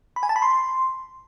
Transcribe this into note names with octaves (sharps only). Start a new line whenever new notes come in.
B5
G#5
A5
B5
C6